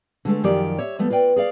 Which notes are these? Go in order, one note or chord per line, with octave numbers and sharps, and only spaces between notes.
D3 G#3 A3
F#2 D#3 F3 G4 D5
C#5 E5
F3 A3 B3
F4 B4 D5 G5
G#4 D5 F5